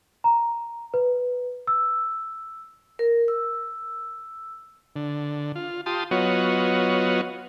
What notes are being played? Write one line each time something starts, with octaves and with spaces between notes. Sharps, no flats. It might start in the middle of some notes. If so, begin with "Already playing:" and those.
A#5
B4
E6
A#4
E6
D3
F4
F4 G4 A5 C6 D#6
F#3 B3 F4 F#4 C#5 D#5